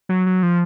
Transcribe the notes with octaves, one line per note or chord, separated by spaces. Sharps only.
F#3
F#3
F3